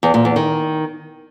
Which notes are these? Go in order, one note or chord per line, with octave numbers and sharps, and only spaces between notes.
E2
A#2
E2
D#3